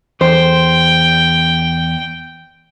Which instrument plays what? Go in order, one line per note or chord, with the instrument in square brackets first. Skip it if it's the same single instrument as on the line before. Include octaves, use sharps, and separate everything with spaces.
[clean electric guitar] E2 [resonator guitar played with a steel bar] C5 [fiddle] G5